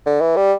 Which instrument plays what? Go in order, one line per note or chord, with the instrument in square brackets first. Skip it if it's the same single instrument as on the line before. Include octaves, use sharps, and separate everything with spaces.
[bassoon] D3
E3
G3